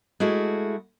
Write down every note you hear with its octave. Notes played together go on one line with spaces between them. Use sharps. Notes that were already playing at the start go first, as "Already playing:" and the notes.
G#3 A3 E4 F#4